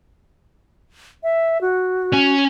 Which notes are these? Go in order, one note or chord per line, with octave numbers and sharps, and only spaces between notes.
E5
F#4
C#4